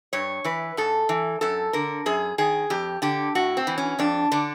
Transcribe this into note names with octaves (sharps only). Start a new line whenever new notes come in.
G2 C#5
E3 B4
G#2 A4
E3
F#2 A4
D3 A#4
F#2 G#4
D#3 G#4
F2 G4
D3 G4
A2 F#4
C4
E3
C#4
F2 D4
D3 D4